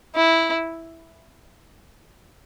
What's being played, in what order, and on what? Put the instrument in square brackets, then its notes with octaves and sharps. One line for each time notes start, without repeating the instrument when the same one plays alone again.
[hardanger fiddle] E4